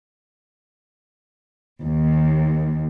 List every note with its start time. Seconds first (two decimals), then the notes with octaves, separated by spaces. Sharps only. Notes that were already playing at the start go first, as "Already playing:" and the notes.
1.83 D#2